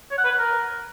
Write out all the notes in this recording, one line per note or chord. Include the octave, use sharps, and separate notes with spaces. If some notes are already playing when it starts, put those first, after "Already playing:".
C#5
F#5
B4
F#5
A#4